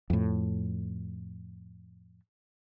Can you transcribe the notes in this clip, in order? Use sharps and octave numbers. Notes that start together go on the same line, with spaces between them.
F2 A2